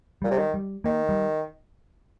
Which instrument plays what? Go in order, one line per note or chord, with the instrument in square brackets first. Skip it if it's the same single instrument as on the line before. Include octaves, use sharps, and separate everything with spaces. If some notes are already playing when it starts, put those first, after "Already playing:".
[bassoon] A#2 [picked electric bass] G3
[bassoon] C3
D#3
[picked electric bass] G3
[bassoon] D#3 [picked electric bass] A#3
[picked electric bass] G3